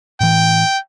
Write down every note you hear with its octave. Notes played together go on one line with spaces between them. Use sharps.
A2 E3 G5